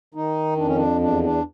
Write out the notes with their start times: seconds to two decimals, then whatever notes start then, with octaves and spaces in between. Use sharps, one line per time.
0.14 D#3 D#4
0.57 F2 D4
0.67 C#4
0.76 D4
1.01 E2 D4
1.23 D4